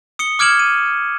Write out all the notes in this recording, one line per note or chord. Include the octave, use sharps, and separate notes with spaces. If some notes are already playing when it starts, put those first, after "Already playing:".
D#6 C#7 G7
D6 F6 G#6 D7 E7 F#7
D#7